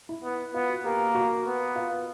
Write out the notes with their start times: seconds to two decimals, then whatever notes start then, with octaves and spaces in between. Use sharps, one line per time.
0.09 E4
0.23 B3
0.54 B3 F4
0.69 F#4
0.84 A#3 G4
1.15 F#4
1.46 B3
1.76 F4